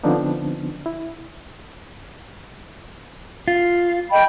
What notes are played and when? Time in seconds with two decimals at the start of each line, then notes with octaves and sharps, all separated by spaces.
0.04 D3 F3 B3 C4 D4 D#4
0.86 E4
3.48 F4
4.12 D#5 G5 B5